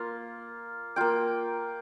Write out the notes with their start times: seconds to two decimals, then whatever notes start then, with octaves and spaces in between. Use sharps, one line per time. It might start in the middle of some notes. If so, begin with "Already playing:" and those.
Already playing: A#3 F4
0.96 A#3 F4 G5